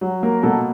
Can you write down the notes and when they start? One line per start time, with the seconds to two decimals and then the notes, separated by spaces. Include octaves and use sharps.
0.01 F#3
0.23 A#3 A#4
0.43 B2 A4